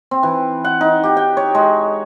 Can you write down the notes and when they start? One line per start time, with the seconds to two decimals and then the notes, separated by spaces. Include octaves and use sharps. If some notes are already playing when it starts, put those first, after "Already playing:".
0.11 C4
0.23 E3
0.65 F#5
0.81 D#4
1.03 G4
1.17 G5
1.37 C#5
1.55 G#3